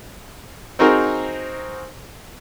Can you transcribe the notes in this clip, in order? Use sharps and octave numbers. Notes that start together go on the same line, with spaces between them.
C4 D#4 F#4 G#4 A#4 C5